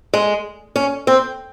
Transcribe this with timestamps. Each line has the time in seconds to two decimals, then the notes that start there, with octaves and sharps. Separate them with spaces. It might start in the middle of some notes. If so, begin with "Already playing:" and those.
0.14 G#3
0.76 C#4
1.07 C4